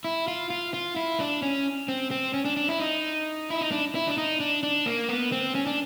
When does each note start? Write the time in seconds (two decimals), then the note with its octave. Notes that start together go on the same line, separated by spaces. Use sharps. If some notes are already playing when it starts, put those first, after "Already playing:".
0.04 E4
0.28 F4
0.50 F4
0.74 F4
0.96 E4
1.20 D4
1.42 C#4
1.88 C4
2.11 C4
2.34 C#4
2.45 D4
2.57 D4
2.68 E4
2.80 D#4
3.50 E4
3.61 D#4
3.72 D4
3.95 E4
4.08 D4
4.18 D#4
4.40 D4
4.63 D4
4.86 A#3
5.09 B3
5.32 C4
5.55 C#4
5.67 D4